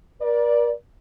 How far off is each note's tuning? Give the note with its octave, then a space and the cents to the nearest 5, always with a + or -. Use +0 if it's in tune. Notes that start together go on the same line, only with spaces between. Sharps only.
A#4 +40 D5 +0